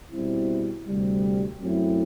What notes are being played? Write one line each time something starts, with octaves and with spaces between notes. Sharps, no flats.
B2 G3 C4 E4
D2 C3 G3
F#2 F#3 A3 C4 E4